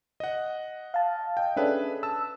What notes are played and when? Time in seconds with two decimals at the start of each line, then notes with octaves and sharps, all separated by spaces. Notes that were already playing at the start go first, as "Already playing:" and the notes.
0.20 D#5 F#5
0.94 F5 A5
1.37 D#5 G5
1.57 C#4 D4 G#4 A4 B4 E5
2.03 A5 E6